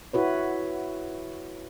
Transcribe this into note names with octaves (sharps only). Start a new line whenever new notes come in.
E4 F#4 B4 C#5